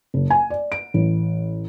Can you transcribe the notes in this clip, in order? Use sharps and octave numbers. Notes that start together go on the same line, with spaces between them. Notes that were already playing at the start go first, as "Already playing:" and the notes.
F#1
G#5
D5
D7
A1